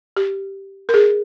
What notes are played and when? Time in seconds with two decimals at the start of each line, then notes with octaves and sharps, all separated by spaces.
0.17 G4
0.89 A#4
0.94 G#4